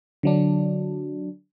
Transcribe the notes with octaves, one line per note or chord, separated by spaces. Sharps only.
D3 F#3 D4